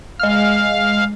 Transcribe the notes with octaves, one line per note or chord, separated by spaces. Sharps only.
G#3 F5 F6